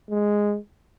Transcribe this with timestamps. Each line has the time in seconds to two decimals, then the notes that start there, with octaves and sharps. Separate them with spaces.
0.10 G#3